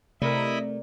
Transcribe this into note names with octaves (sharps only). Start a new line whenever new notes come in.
C3 A3 E4 A#4 D5 D#5 B5